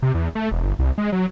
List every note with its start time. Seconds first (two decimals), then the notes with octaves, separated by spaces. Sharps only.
0.02 C3
0.14 E2
0.35 A3
0.52 E1
0.64 G1
0.79 C2
0.98 G#3
1.12 F#3